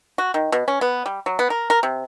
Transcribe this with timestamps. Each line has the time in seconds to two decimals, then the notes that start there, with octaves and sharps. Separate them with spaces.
0.18 F#4
0.34 D#3
0.52 B2
0.68 C#4
0.81 B3
1.06 G3
1.26 F#3
1.39 B3
1.50 A#4
1.70 A#4
1.83 C3